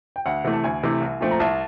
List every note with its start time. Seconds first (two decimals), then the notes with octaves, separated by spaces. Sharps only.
0.16 G5
0.26 D2 F#5
0.44 C3 E3 A3
0.53 A5
0.64 D2 G#5
0.83 C3 E3 A3
1.01 C2
1.21 A#2 F3 A3 C4
1.31 A#5
1.40 C2 A5